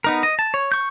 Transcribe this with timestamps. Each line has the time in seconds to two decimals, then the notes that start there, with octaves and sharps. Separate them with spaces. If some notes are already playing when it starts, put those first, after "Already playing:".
0.04 B3 D#4 A#4
0.23 D#5
0.39 A5
0.54 C#5
0.72 C#6 G6